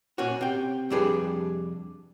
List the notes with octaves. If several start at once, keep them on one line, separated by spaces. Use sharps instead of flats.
A#2 C#4 F#4
C3 G5
F2 C3 G3 D4 G#4 B4